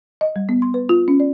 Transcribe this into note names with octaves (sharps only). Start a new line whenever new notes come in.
D#5
G3
B3
C6
B4
F4
C#4
D5